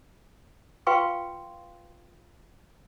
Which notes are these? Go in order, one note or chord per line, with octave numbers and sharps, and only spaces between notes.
F4 B4 F5 G5 C6 C#6